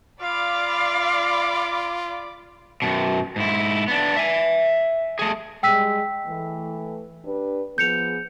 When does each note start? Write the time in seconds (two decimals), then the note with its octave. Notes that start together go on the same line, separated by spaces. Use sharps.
0.22 F4 D5 F5 B5 D6
2.82 F#2 B2
3.36 G#2 E4
3.88 B3 D4
4.17 E5 G#5
5.19 A3 G#4
5.63 G3 G#3 G5 E6 B6
6.27 E3 A3
7.25 D4 G4 B4
7.78 F3 B3 G#4 G6 C#7 F7